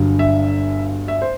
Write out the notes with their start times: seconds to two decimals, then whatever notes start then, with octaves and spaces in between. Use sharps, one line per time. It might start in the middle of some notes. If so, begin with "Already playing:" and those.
Already playing: G1 G2 D3 F#3
0.19 E5
1.08 E5
1.22 C5